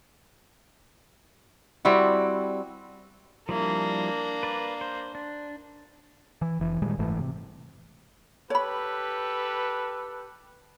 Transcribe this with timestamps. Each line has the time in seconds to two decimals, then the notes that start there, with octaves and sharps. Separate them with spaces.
1.85 G3 C4 E4 F#4
3.49 F3 G3 A#3 D4 E4
4.43 B4 D5
4.81 C5
5.15 D4
6.42 E3
6.59 F1 E3
6.82 A#2 D#3 G3 G#3
6.98 F#1 G#2 E3 A3
7.19 C3
8.50 G4 A4 B4 C#5 B5